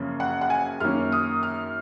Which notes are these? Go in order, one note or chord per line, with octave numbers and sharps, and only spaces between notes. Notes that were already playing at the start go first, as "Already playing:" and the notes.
Already playing: F#2 C#3 F3 A#3 C#4
F#5
F#5
G#5
F#2 D#3 A#3 C#4 F6
D#6
F6